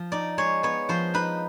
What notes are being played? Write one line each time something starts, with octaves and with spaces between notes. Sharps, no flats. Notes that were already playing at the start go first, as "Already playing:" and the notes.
Already playing: F3
D#4 D5
G#3 C#5
B3 C#5
F3 C5
D#4 B4